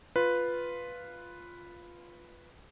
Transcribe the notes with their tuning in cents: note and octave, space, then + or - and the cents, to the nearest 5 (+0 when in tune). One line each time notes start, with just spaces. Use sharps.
F4 +0 B4 +0